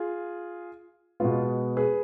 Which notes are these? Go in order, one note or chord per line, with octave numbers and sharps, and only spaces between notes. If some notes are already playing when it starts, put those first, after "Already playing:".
Already playing: F4 G#4
B2 G#3 B3 F4
G#4 B4